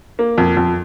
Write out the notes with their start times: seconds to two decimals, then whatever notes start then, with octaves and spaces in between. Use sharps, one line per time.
0.19 A#3
0.38 F2
0.57 F2